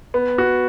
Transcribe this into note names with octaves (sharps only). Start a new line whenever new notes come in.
B3
F#4